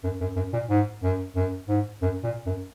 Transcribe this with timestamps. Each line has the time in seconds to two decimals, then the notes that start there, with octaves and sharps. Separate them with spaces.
0.03 F#2
0.21 F#2
0.36 F#2
0.53 A#2
0.70 G#2
1.03 F#2
1.35 F#2
1.68 G#2
2.02 F#2
2.23 A#2
2.46 F#2